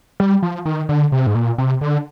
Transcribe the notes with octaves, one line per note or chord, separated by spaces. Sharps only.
G3
F3
D#3
D3
C3
G#2
A#2
C3
D3